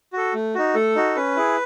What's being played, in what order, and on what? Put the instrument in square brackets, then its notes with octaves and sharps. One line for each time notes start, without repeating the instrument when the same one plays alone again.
[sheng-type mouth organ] F#4 A4
A3
D#4 F#4
A3 A4
D#4 F#4
C#4 B4
E4 G#4